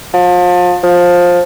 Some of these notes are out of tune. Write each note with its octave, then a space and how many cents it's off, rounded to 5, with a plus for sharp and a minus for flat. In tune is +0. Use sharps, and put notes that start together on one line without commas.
F3 +35
F3 +15